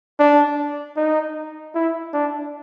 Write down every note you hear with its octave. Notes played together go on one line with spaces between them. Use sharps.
D4
D#4
E4
D4